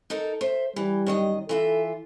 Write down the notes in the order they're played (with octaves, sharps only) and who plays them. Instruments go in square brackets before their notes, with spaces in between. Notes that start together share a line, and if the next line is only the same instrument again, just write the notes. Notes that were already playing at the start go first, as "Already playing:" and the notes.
[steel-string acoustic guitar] D#4 A4 A#4
C5 E5
[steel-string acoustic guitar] E3 [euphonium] G3
[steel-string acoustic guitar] F#2 D#3 D#5
[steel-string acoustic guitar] E3 F4 E5 [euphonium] A4